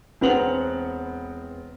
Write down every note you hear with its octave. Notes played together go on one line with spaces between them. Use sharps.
E1 B3 C4 F#5 F7 F#7